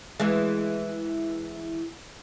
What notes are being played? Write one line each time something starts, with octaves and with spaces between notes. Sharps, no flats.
E3 G#3